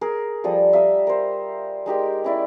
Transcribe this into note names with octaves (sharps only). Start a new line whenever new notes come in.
G#4 A#4
F3 G3 A4 D#6
E5 F5 A#5 D#6
A#4 C5
G#3 D#4 G4 A#4
C#4 E4 D5